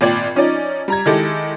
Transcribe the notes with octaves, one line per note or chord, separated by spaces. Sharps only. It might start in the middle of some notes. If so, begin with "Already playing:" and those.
G#1 A#2 D5 G5 G#6 F#7
F3 C#4 D#4 D5
G3 A#5 G#6
D#3 G#3 E4 G4 A4